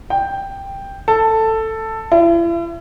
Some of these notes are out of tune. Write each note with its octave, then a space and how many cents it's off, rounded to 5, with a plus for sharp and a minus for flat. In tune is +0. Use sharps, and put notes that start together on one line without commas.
G5 +5
A4 +10
E4 +40